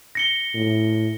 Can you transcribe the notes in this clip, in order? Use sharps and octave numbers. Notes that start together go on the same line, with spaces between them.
A#6 C#7 G7
A2